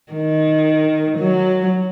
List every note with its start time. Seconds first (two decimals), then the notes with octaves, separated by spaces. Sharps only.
0.12 D#3
1.17 F#3